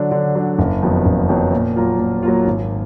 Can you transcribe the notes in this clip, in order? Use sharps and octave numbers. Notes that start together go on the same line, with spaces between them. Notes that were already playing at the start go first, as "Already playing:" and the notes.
Already playing: D3 F#3 D4
D3
F#3 D4
F#1
F2 D#3 F#3 B3
F#1
F2 D#3 F#3 B3
A#2
F#3 A#3 F4
A#2
F#3 A#3 F4
G#1